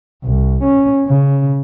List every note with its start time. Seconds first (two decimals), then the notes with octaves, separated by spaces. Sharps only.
0.24 C2
0.64 C#4
1.06 C#3